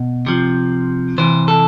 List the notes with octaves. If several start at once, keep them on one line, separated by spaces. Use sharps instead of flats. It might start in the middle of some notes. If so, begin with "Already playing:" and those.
Already playing: B2
C3 F3
C3 E3 C5
A4